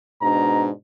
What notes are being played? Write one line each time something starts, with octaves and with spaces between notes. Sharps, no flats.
G#2 B2 D4 A#5